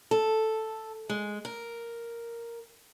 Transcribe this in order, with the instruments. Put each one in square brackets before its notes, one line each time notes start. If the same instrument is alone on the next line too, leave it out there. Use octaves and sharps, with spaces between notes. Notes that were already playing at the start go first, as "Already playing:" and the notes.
[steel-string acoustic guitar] A4
G#3
A#4